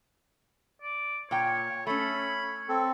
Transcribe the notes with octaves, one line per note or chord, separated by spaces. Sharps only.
D5
A#2 C#5 G5
A3 C#4 A4 B5
C#5
C4 A4